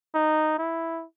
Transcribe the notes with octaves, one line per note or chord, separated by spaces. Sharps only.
D#4
E4